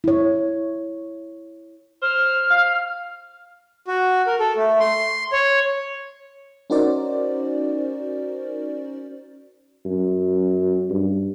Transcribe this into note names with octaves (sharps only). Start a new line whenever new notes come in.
E4 C#5
C5 F6
F5
F#4
A#4
A4
A3
C6
C#5
C#4 D#4 F#4 A#4 C5 D5
F#2
G2